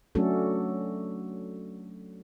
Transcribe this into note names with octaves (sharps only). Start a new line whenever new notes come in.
F#3 A3 C#4 D4 F#4 A4